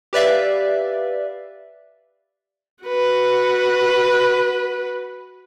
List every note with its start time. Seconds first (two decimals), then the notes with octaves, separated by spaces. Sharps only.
0.13 G4 B4 D5 E5 F5
2.84 F#4 B4